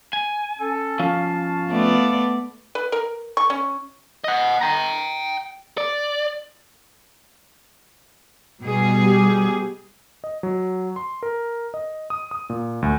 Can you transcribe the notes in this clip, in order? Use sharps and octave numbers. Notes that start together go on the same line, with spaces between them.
G#5
C#4 A4
F3 C#4 F5 A5
A3 B3 D5
B4
A#4
C#6
C#4
D#5 F#5
G5 A#5
D5
B2 G3 G#4
G4
D#5
F#3
C6
A#4
D#5
D#6
D#6
A#2
D2